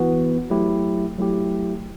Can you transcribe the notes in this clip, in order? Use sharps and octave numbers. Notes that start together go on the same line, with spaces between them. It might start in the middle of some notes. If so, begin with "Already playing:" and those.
Already playing: E3 B3 F#4
F#3 A3 E4 G4
F#3 A3 E4 G4